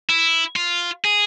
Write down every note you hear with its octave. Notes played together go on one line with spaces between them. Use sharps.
E4
F4
G#4